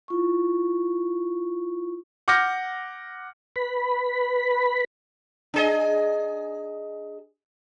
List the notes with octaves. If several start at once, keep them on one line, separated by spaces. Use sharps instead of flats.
E4 F4 C#6
F#5 D6 F6 G6 A#6 C#7
B4 B5
D4 G#4 D#5